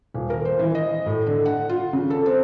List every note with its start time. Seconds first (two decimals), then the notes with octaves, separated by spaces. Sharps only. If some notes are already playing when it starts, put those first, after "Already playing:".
0.14 D#1
0.30 A#4
0.45 C5
0.59 E3
0.75 D#5
1.06 A2
1.26 D3
1.46 F#5
1.69 F4
1.93 C#3
2.10 A4
2.26 C4